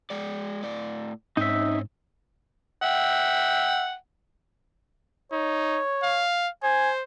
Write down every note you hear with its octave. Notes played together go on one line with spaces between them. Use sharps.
G#3 D5
A2 D5
G#2 C4 C#4 D#4 E5
E5 F#5 G5
D#4 C#5
F5
C5 G#5